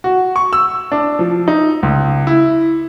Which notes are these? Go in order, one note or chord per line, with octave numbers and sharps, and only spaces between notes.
F#4
C#6
E6
D4
F3
D#4
C#2
E4